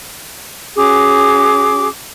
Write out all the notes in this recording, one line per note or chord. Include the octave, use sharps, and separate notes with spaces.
C#4 F#4 G#4 D6